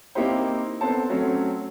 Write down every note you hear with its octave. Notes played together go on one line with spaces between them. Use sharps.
A#3 C4 D#4 E4 G4 C5
B3 C4 A4 C5 A5
F#3 A3 C4 C#4